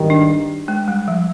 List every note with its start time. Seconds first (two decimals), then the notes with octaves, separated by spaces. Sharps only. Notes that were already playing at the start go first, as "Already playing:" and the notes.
Already playing: G#1 G2 D#3 G3
0.10 D4
0.68 G#3
0.88 G3
1.08 F3